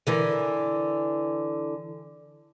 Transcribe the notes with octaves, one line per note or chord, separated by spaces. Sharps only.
D3 E3 A#4